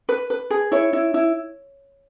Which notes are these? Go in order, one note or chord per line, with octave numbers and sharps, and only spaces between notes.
B4
B4
G#4
E4 C#5
E4
E4